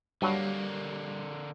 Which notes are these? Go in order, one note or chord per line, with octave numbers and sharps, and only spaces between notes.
G2 D3 F#3 G3 A#3